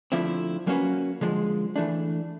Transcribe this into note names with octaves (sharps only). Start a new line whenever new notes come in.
D3 F3 A3 C4 E4
F#3 A#3 C#4 F#4 B4
D3 F3 G#3
E3 A3 D4